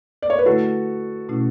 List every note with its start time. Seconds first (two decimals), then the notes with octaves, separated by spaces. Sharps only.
0.22 D5
0.30 C#5
0.39 B4
0.46 D3 A3 E4 F#4 A4
1.29 B2 A3 C#4 E4